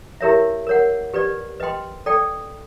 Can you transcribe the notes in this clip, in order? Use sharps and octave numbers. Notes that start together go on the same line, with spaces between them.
E4 G4 A#4 C#5 E5
A#4 C#5 F#5
G4 B4 D5
B4 D#5 G5 C6
A4 D5 G5